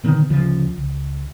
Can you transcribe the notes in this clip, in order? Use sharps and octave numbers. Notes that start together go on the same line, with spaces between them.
A#2 D3 D#3 B3
D2 C#3 F3
C#2